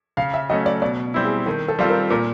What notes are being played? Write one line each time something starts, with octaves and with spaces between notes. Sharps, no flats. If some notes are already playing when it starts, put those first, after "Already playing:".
C#3 F5
E5
F#3 A3 C#4 D#5
D5
B2 D5
G3 C4 E4
G#4
D#3 A4
A4
G3 C4 F4 A4
A#4
A#2 A#4